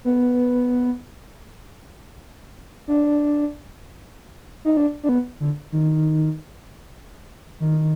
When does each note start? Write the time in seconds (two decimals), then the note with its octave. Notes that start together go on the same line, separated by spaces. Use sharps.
0.05 B3
2.88 D4
4.65 D#4
4.77 D4
5.03 D4
5.09 B3
5.40 D3
5.72 D#3
7.60 D#3